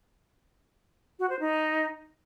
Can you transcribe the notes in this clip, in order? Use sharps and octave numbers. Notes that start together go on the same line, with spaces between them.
F#4
C5
D#4